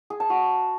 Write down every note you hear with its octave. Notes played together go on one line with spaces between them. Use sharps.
G#4
A5
F#4